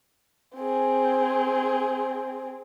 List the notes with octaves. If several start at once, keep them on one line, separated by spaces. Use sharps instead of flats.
C4 G#4